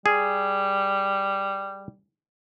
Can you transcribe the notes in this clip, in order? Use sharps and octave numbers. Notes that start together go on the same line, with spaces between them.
G3 G#4